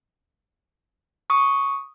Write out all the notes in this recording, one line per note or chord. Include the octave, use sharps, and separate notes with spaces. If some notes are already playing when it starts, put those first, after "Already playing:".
C#6 D#6